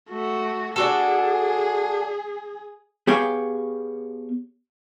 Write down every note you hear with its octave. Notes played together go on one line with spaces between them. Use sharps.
A3 F#4
D4 F#4 G#4 A4
B3 G4 G#4 C#5 F5 G5